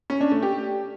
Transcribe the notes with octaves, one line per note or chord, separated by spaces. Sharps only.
C#4
D4
A3
G4